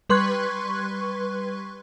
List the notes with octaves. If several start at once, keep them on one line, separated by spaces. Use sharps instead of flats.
G3 B4 C6 C#6 F#6 G#6